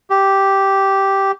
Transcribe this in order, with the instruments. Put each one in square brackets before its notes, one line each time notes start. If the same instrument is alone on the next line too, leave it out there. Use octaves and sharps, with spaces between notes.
[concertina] G4